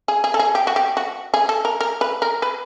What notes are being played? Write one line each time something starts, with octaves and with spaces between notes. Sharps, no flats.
G#4
G#4
A4
G#4
G4
F#4
G4
F#4
G#4
A4
A#4
A#4
B4
A#4
B4